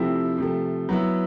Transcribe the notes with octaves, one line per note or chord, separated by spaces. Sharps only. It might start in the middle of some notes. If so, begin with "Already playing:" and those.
Already playing: C3 F3 A3 C4 E4
C3 F3 A3
F#3 B3 E4